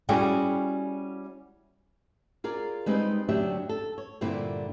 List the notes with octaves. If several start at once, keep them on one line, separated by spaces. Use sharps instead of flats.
G3 C#4 E4 F#4 G#4 G5
F4 G#4 A#4 D5
G3 G#3 C4 D#4 B4
D2 F#3 D4 G4 E5 G5
A4
C#5
G2 A#2 D3 C4 E4